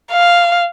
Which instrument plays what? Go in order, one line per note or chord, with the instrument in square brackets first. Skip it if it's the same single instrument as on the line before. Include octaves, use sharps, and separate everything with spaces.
[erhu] F5